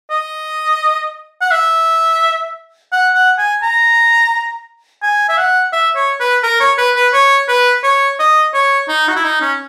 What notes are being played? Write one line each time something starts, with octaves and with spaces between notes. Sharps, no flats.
D#5
F#5
E5
F#5
F#5
G#5
A#5
G#5
E5
F#5
E5
C#5
B4
A#4
C#5
B4
B4
C#5
B4
C#5
D#5
C#5
D#4
F#4
E4
D#4
C#4